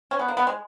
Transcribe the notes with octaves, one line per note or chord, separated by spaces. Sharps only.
C#4
B3
A#3
B3
G#3